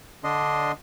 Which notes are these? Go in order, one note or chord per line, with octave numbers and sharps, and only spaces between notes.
D3 D4 D#5 C6